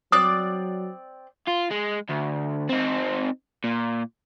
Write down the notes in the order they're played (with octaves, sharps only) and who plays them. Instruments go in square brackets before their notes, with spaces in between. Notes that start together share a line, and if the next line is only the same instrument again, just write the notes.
[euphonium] F#3 [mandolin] C4 D5 F#6 [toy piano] D#6
[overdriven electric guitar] F4
G#3
D2
C4 D#4
A#2